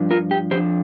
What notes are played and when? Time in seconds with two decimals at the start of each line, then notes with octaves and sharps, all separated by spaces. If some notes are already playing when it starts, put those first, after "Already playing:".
Already playing: G2 F3 D4
0.11 F4 A#4
0.31 G4
0.51 F2 F3 D4 G4 C5